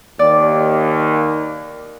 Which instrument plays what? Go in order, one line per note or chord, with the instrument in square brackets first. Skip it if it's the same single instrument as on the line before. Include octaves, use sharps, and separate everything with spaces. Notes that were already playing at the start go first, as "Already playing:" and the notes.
[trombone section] D#2 [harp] D5